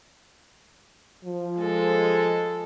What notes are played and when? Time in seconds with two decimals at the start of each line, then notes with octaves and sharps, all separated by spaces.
1.25 F3
1.58 G#3 A4